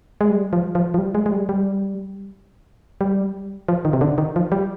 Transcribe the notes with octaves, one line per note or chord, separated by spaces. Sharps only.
G#3
G3
F3
F3
F3
G3
G#3
G#3
G3
G3
G3
F3
D#3
C3
D3
D#3
F3
G3